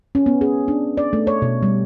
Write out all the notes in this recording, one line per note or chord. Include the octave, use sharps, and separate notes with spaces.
C#4
B3
G#4
D4
D5
A3
C#5
B2
G3